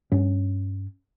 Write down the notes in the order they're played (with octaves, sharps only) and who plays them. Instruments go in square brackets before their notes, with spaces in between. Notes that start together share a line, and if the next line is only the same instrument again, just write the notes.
[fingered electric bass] G2 C#4